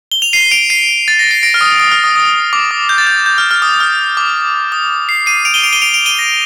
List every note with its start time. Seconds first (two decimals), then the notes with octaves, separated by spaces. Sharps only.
0.12 G7
0.22 F7
0.33 C7 D#7
0.51 D7 F7
0.70 C7 D#7
1.08 A6
1.19 A#6
1.31 C7
1.43 A#6 D7
1.54 F6
1.61 D#6
1.80 D#6
1.92 F6
2.04 D#6
2.16 D#6
2.53 D6
2.71 D#6
2.89 G6
2.98 A6
3.07 G6
3.26 G6
3.38 F6
3.51 F6
3.62 D#6
3.80 F6
4.17 D6
4.72 D#6
5.09 C7
5.26 C7 D#7
5.45 D7 F7
5.54 D#7 G7
5.63 D7 F7
5.73 D#7 G7
5.82 D7 F7
5.94 D7 F7
6.06 D#7 G7
6.19 A#6